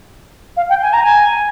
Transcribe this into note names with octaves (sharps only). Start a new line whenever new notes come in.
F5
G5
G#5
A#5
G#5